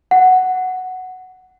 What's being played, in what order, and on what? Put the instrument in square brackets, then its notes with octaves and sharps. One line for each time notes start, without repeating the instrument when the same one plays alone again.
[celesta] F#5